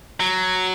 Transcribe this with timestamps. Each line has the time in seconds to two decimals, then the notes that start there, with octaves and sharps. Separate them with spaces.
0.20 F#3